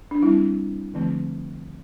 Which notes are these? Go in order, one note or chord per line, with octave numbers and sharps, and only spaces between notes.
D4
G3 C4 E4
D3 F3 A3 C4